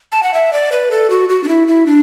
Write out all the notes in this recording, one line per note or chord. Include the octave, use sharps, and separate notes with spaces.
A5
F#5
E5
D5
B4
A4
F#4
F#4
D4
E4
E4
D4